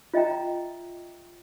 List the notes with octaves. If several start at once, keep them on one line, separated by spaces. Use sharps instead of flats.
F4 D#5 E5 G5 A#5